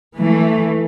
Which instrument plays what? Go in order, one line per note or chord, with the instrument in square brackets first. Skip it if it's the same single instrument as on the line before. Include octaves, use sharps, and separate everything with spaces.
[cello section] E3 A3